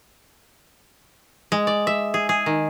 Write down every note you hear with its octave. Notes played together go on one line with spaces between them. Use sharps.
G#3
D5
E5
G#4
G#4
D#3